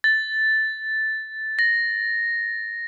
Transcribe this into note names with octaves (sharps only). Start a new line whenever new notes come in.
A6
A#6